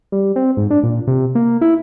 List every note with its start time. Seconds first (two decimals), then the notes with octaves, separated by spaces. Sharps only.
0.12 G3
0.36 C4
0.57 G#2
0.70 D4
0.83 A#2
1.07 C3
1.35 A#3
1.61 E4